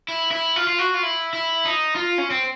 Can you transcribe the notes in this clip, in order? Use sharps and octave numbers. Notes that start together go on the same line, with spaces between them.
E4
E4
F4
F4
F#4
F4
E4
E4
D#4
F4
C#4
C4